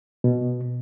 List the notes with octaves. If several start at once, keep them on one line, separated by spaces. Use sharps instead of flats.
B2